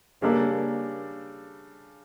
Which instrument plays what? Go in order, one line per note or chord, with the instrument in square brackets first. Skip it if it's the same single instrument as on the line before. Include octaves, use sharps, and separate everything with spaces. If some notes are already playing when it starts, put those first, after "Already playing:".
[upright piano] C#3 G3 D4 A4 D5 [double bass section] A#3